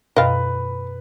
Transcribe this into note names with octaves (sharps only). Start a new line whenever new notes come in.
F#2 B2 B4 D#5 F5